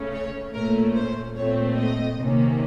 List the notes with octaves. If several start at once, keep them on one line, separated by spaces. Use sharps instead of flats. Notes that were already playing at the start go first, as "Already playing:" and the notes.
Already playing: C#3 A3 C#4
C#5
A#2 A3 C#4 A#4
C5
A#2 A3 C4 C#5
D#5
C3 D#3 A#3 C#4